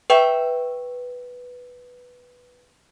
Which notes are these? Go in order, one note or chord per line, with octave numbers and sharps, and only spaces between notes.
B4 E5 G5 C#6